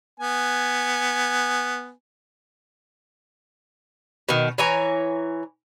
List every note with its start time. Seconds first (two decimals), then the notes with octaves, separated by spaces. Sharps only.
0.20 B3 G#5
4.29 B2 D#3
4.58 E3 C#5 G#5 A#5